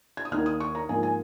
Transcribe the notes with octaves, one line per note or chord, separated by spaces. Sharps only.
G#6
D#6
D#2 D#3 A#3 F6
D#6
C#6
A#5
G#2 F3 A#3 G#5
G#5